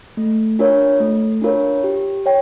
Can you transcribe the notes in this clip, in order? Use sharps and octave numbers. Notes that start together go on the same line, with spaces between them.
A3
D4 F4 A#4 C#5
A3
D4 F4 A#4 C#5
G4
C#5 G5